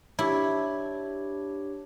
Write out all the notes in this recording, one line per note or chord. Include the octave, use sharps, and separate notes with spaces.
D4 E4 G4 C#5